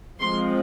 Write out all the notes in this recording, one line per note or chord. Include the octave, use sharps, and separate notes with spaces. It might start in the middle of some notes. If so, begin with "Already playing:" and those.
F3 G#3 C4 C6